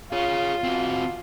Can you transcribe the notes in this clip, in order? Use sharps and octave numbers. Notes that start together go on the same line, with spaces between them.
F4 G#4 C#5
C4 F#4